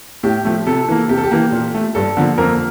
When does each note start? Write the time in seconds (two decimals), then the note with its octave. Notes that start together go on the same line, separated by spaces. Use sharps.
0.23 A2 G4
0.45 F3 A3
0.66 C3 A4
0.88 E3 A#3
1.09 C3 G4
1.18 A4
1.24 G4
1.31 E3 A#3
1.52 A#2
1.75 A3
1.95 G2 A4
2.17 D3 F3 A#3
2.38 F2 A#3 A#4